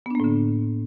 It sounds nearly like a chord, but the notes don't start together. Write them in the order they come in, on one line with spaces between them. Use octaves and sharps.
B3 D4 A#3 A2 D3